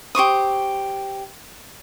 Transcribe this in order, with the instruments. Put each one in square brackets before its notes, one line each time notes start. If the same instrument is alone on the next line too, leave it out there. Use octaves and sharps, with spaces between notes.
[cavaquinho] G4 C5 C#6 D#6